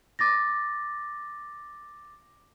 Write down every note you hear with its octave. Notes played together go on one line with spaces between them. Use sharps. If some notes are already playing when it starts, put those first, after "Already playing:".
D6 A6 A#6